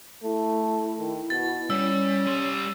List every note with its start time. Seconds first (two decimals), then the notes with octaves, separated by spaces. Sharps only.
0.23 A3 E4
0.99 D#3
1.30 B2 A6
1.70 G3 C#4 E6
2.26 G3 C6